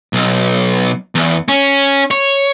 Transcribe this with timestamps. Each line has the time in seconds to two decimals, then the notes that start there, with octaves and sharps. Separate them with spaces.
0.13 B1
1.15 E2
1.48 C#4
2.11 C#5